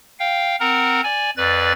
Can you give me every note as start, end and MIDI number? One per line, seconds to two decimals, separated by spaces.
0.19 0.56 77
0.19 0.56 79
0.60 1.01 60
0.60 1.01 70
0.60 1.01 78
0.60 1.01 82
1.04 1.30 74
1.04 1.30 80
1.37 1.72 41
1.37 1.72 71
1.37 1.72 74
1.37 1.72 93